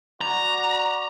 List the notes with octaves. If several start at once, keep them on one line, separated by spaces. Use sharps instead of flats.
F#4 D5 A#5